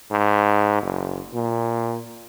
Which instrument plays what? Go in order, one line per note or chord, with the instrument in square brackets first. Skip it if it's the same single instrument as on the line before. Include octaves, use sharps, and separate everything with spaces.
[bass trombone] G#2
F#1
A#2